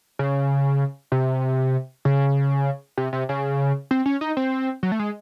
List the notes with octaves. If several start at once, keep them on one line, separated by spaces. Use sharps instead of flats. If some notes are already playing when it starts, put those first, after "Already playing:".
C#3
C3
C#3
C3
C3
C#3
C4
C#4
D#4
C4
F#3
A3
G#3